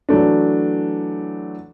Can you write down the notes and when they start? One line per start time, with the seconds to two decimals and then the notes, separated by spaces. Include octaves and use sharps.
0.09 E3 F#3 A3 D4